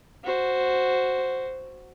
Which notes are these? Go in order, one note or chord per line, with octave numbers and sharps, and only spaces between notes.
F#4 C5